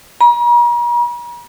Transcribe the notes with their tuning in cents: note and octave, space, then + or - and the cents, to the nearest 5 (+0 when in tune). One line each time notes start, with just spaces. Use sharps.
A#5 +45